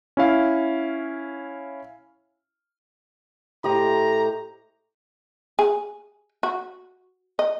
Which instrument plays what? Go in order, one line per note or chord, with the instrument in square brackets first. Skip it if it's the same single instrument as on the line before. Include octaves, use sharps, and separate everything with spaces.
[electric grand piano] C#4 E4 F5
[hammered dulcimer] A2 [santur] G4 C5 D#5 [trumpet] A#5
[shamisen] G#4
F#4
D#5